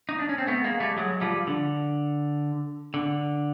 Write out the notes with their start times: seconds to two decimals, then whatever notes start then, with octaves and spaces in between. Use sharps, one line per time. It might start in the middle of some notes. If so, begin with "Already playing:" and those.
0.09 D#4
0.19 D4
0.29 C#4
0.38 C4
0.47 A3 B3
0.64 G#3 A#3
0.80 G3 A3
0.97 F#3 G#3
1.21 F3 G3
1.47 D3
2.94 D3